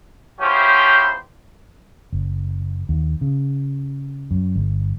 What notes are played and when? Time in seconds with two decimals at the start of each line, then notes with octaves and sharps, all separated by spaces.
0.40 E2 F3 C#4 E4 G4 C5
2.12 F#1
2.89 D#2
3.21 C#3
4.31 F#2
4.56 G1